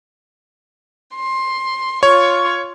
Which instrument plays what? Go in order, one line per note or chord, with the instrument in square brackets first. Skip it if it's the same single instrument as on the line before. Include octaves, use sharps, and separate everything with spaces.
[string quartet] C6
[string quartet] F4 C#6 [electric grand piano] C#5